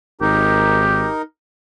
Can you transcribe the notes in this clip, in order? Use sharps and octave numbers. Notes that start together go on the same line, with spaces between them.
G#1 D#4 G4 A#4